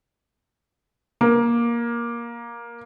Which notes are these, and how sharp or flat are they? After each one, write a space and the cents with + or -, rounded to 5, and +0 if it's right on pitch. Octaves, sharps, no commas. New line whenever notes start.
A#3 +15